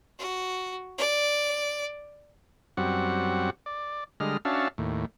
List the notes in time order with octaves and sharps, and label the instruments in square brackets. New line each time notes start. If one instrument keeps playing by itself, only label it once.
[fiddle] F#4
D5
[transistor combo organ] F#2 G3 C4 F#4 F#5
D5
D3 G3 G#3 D#5 F6
C#4 D4 F#4 E5 F5 A5
D#2 A2